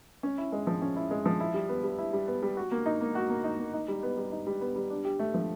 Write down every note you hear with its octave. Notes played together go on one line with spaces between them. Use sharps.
C#4
E4
G#3
F3
C#4
E4
G#3
F3
E4
G3
B3
G3
E4
G3
B3
G3
F#4
A#3
D#4
A#3
F#4
A#3
D#4
A#3
D#4
G3
B3
G3
D#4
G3
B3
G3
D4
G4
A3
F3